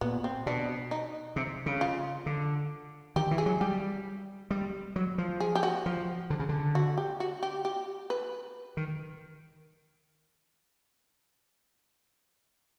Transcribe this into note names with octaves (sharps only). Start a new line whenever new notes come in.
A#2 B3
C4
B2 D4
D#4
C3
C#3
F4
D3
D#3 G4
E3
G#4
F#3
G3 G4
G3
F#3
F3
G#4
G4
F#4
F3
D3
C#3
D3
F#4
G4
F#4
G4
G4
B4
D#3